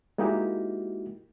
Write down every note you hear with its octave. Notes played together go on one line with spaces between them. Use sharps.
G#3 A#3 D#4 E4 F#4 G4